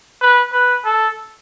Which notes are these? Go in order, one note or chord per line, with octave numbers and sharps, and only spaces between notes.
B4
B4
A4